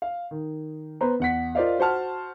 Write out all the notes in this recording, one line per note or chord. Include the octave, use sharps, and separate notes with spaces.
F5
D#3
B3 B4 C5 A#5
E2 F#5 B6
F4 A#4 C5 D5 D#5 F5
F#4 C5 F#5 A5 F6